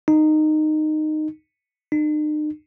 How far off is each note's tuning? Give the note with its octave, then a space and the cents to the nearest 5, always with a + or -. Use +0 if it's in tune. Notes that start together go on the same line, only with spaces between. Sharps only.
D#4 -15
D#4 -45